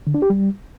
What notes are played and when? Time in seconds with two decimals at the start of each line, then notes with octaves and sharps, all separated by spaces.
0.07 D3
0.14 D4
0.22 G4
0.30 G3